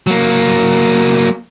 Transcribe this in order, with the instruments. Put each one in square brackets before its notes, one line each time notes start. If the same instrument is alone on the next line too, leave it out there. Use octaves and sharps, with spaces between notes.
[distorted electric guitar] F#3 A#3